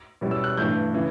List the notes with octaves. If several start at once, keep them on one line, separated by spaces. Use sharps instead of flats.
B2 G3 C#4 E4
E6
F#6
G2 E3 A3 G6
C#3 E3